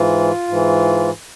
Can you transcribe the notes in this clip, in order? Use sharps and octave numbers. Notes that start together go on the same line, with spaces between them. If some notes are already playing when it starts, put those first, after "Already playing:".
Already playing: G#2 E3 F4
G#2 E3